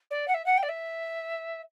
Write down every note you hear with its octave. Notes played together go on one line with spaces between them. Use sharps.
D5
F#5
E5
F#5
G5
D5
E5